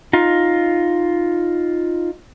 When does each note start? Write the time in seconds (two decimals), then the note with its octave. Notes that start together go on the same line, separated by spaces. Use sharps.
0.13 D#4 F4